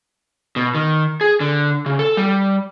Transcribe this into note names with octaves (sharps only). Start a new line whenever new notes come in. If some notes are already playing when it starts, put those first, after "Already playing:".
B2
D#3
G#4
D3
C#3
A4
G3